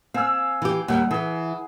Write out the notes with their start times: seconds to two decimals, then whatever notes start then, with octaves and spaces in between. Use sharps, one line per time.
0.14 C4 F5 G#5 E6
0.62 E3 G4
0.88 D#2 G3 F#5
1.11 E3 G#4